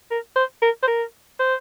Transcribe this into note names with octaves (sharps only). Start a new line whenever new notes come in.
A#4
C5
A#4
C5
A#4
C5